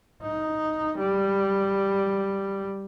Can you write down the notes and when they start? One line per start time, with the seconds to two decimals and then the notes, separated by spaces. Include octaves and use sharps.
0.22 D#4
0.98 G3